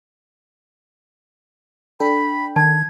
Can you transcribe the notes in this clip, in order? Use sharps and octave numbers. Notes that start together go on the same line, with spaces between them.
D4 A4 G5 B5
D#3 A5 G#6